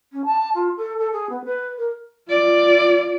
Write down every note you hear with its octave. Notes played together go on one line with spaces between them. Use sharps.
C#4
A5
F4
A4
A4
G#4
B3
B4
A#4
F4 D5